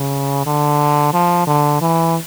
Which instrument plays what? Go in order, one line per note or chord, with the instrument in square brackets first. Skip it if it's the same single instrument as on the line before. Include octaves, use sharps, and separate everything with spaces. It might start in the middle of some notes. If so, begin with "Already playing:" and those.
Already playing: [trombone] C#3
D3
F3
D3
E3